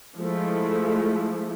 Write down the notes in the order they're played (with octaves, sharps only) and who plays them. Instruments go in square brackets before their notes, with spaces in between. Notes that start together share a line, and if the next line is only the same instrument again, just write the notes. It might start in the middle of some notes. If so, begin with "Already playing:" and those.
[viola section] F3 G#3 A3 E4